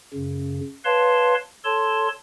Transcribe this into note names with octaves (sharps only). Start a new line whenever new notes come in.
F#2 C#3
B4 C#5 F5 A5 C6
A4 C#5 A5 C6